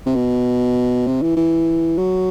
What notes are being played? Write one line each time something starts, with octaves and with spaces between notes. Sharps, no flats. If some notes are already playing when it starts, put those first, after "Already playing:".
C3
B2
C3
E3
E3
F#3